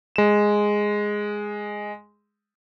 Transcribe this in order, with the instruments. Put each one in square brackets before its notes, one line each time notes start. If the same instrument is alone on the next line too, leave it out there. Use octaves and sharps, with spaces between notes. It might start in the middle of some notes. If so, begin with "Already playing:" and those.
[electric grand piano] G#3 E7